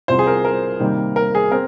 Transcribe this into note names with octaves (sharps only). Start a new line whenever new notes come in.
C2 C3 F3 C5
G#4
A#4
A#4
C3 D#3 G3 A#3
A#4
G#4
C4 A#4